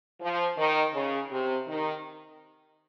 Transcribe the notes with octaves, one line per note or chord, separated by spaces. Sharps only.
F3
D#3
C#3
C3
D#3